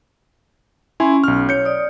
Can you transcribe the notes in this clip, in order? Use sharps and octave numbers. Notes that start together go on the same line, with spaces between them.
C#4 E4 G#5 C6
B1 F6
C#5 G6 C#7
D5 D#6